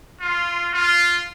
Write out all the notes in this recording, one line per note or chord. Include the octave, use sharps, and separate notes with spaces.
F4
F4